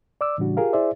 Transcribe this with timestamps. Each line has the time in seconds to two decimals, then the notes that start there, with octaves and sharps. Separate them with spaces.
0.21 D5 D6 E6
0.38 A2 C#3 E3 G3 D4 F#4
0.57 F4 G4 G#4 A#4 F5
0.73 E4 G#4 C5 D5 E5